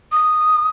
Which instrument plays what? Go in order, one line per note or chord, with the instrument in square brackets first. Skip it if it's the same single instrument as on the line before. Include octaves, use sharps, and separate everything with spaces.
[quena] D#6